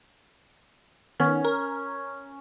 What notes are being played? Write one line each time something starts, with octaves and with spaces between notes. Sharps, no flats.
D#3 B3 C#4
A#4